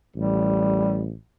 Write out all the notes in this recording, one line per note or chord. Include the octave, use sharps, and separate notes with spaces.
A1 G3